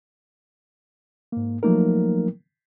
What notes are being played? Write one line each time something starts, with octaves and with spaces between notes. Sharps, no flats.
G#2 A#3
F3 F#3 A3 A#3 D#4 A#4